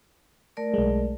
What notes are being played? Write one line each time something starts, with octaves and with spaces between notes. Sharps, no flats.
A3 A#4 D5
B1 G#3